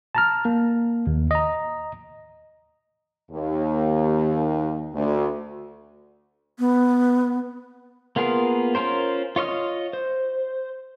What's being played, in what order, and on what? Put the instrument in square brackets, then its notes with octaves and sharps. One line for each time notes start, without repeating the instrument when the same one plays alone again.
[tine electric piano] A5 A#5 F6
A#3
D#2
D#5 A#5
[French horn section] D#2
D2
[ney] B3
[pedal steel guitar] A#3 B3 F4 G#4 A#4
C#4 F4 A#4 C5
F4 C#5 D#5 F6
C5